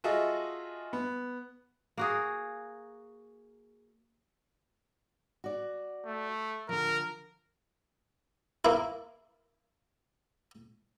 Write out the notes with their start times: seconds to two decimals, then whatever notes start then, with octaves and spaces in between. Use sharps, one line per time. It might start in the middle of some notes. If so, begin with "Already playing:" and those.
0.04 F4 F#4 G#4 A4 D#5 E5
0.93 B3
1.97 A#3 F#4 G#4
5.44 F#4 D5
6.06 A3
6.69 D3 F3 A#4
8.65 A#3 E4